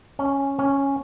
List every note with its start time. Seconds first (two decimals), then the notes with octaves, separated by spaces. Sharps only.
0.19 C#4
0.59 C#4